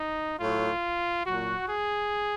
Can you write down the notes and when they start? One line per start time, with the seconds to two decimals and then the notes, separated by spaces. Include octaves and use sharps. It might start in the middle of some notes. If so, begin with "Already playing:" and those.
Already playing: D#4
0.38 A2 F#3 F4
1.24 A#2 F#3 F#4
1.67 G#4